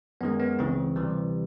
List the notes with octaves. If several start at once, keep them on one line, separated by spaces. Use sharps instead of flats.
F#2 D#3 G#3 B3
B3
C#2 C#3 E3 C4
D2 C3 E3 G3